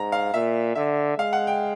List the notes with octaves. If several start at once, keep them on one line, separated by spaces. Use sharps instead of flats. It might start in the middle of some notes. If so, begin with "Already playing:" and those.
Already playing: G#2 A#5
F5
A#2 E5
D3 E5
G#3 F5
F#5
G5